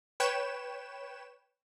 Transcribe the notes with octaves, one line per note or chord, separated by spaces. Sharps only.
B4 C#5 G5 E7